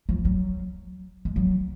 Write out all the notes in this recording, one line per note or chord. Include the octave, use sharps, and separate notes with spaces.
F3
F#3
G#3
F#3